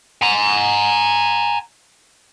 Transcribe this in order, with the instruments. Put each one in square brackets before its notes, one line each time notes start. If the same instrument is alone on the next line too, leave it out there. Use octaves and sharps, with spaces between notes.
[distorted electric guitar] G#5 A#5